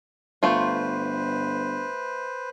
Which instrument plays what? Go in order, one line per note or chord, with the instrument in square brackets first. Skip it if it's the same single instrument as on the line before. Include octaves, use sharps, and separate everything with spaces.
[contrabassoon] G1 [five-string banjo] A3 F4 [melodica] B4 C5